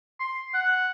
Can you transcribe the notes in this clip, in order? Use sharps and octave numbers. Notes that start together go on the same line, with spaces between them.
C6
F#5